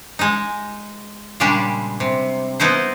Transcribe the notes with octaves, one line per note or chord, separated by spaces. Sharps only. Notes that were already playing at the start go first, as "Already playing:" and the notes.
G#3 D#4
A#2 C#3 G3 G#3 D4 G4
C3
B3 D#4 E4 C5